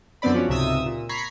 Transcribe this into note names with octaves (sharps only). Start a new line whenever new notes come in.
F#2 D3 B3 C4 D5 B5
F3 C#4 F#4
C#2 G#2 C3 E5 D#6 E6
A#2
A#5 B5 C#6 G#6 B6 C7